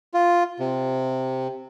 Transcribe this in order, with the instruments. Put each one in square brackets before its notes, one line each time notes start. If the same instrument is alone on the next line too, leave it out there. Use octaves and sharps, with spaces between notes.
[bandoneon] F4
C3